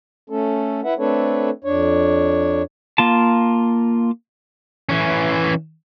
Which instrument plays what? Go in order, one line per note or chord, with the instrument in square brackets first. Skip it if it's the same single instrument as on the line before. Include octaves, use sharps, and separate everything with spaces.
[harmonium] A3 C#4 A4
E4 B4 E5 F#5
A3 C4 D4 A4 B4 C#5
F2 D4 C#5
[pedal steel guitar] A#3 F4 A5
[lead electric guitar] E3 C#4